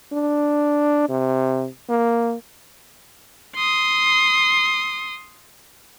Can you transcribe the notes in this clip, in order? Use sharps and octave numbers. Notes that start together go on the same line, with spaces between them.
D4
C3
A#3
C6 D#6